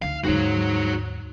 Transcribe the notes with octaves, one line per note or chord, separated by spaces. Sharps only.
D2 D#4 F5
D#2 G#2 D3 F#4 C#5